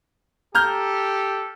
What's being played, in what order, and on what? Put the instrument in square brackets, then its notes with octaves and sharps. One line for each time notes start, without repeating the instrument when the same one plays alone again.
[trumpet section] G4 A4 [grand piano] A#5 F6 G6